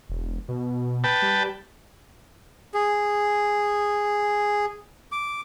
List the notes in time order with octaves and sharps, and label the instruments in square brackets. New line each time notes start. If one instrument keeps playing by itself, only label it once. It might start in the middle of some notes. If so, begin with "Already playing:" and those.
[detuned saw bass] E1
B2
[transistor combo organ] B4 G5 A5
[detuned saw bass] G3
[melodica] G#4
D6